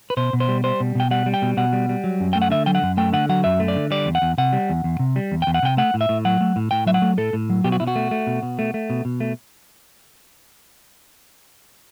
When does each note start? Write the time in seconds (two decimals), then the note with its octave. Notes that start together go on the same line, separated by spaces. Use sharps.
0.10 B4
0.17 B2 C5
0.33 B2
0.40 C5
0.48 G3
0.64 G3 C5
0.80 B2
0.95 B2 G5
1.11 G3 F#5
1.26 G3
1.34 G5
1.42 B2
1.57 B2 F#5
1.73 G3
1.89 G3
2.04 F#3
2.20 F#2
2.33 A3 G5
2.42 F#5
2.50 D3 E5
2.66 F#3 G5
2.75 F#5
2.83 F#2
2.97 A3 G5
3.13 D3 F#5
3.29 F#3 F#5
3.44 F#2 E5
3.60 A3
3.68 D5
3.76 D3
3.91 G3 D5
4.06 E2
4.15 F#5
4.22 E2
4.38 C3 F#5
4.53 G3
4.69 E2
4.84 E2
4.99 C3
5.16 G3
5.32 E2
5.42 E2 G5
5.54 F#5
5.63 C3 G5
5.77 A3 F#5
5.94 A2
6.01 E5
6.09 A2
6.25 F#3 F#5
6.41 A3
6.56 A2
6.71 A2 G5
6.87 F#3 E5
6.94 F#5
7.02 A3
7.17 A2 A4
7.33 A2
7.50 F#3
7.64 B2 G4
7.72 F#4
7.80 B2 E4
7.87 F#4
7.96 A3
8.11 A3
8.27 B2
8.43 B2
8.59 A3
8.74 A3
8.90 B2
9.05 B2
9.20 A3